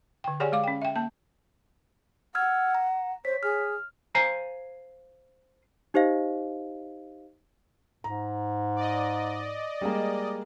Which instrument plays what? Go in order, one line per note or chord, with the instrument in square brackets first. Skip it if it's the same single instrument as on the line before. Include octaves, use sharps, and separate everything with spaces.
[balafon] D3 G5
G4 G#4 C#5 D5 F#5 G#5
G#3 F5 D6
C#4 G5
E5 G5
A#3 A5
[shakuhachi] F#5 [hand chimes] E6 F6 G#6
[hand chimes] A#5
[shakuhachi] C5 [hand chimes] C#5 B6
[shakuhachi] G#4 [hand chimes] F6
[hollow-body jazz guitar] C5 F5 G#5 A#5
[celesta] D#4 G4 C5 D#5 F5
[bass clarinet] G#2 [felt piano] A#5
[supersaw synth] D5 D#5
[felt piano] G3 G#3 A#3